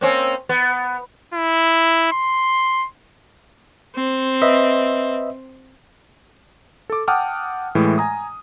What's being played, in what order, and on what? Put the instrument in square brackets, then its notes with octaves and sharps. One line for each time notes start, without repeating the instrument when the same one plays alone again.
[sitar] A#3 C4 C#4
B3
[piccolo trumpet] E4
C6
[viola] C4
[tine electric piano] B4 D#5 E5
[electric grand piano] A4 D6
F#5 G5 A5 D6 D#6 F6
A2 E3 G#3
G#5 A#5 D#6